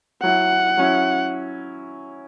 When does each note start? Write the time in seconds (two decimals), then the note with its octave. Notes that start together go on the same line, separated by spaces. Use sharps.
0.23 F#3 E4 F#5
0.77 F#3 C#4 E4